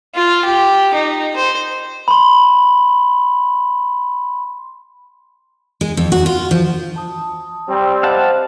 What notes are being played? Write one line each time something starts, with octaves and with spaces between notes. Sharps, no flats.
F4
G4
D#4
C5
B5 C6
G#3
F2
F#4
F4
F3
A5 D#6
G3 C4
C5 D#5 F5 F#5 A5